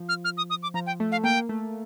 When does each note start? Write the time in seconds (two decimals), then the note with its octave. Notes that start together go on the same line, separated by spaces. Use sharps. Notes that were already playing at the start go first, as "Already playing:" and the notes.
Already playing: F3
0.09 F6
0.24 F6
0.37 D#6
0.50 D#6
0.63 D6
0.74 F3 A#5
0.86 G5
1.00 A3
1.12 F5
1.24 A#3 G5
1.49 A3